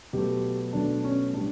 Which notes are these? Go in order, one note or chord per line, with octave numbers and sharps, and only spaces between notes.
B2 F#3 A3 G4
B2 F#3 A3 D4
C#4
A2 G3 D4